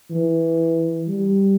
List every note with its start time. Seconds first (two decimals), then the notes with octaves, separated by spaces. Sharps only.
0.11 E3
1.08 G3